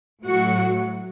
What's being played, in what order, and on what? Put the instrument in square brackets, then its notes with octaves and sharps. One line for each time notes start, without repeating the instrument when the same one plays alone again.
[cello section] A2 F#3 F#4